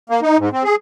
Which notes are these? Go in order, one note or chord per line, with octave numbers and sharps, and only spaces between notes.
A#3
D#4
G#2
C4
G#4